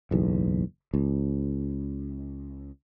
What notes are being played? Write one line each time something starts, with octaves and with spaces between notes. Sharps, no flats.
F#1 B1 E2
C#2